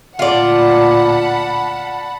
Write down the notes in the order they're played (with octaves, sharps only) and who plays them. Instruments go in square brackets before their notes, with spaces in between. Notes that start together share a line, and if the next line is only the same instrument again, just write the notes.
[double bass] D2 A#2 [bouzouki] F4 D5 [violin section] F#5 A5 B5